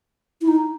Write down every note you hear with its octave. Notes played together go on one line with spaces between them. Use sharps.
E4
D#4